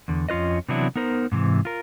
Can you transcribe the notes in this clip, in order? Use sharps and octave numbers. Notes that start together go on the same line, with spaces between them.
E2 D3
F2 C#4 F4 B4 D#5
C3 E3 F#3 B3 D4 E4
B3 D#4 A#4 C5
G#2 C3 E3
F4 A#4